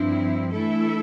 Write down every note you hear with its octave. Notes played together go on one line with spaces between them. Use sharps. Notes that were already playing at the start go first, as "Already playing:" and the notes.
Already playing: G2 F3 C4 D4 E4
E3 A3 E4 A4 E5